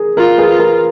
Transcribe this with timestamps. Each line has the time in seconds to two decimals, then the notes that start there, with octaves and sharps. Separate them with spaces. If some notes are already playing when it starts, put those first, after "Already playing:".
Already playing: G#4 A#4
0.17 F4 A#4
0.38 G#4 B4
0.49 F4
0.59 A#4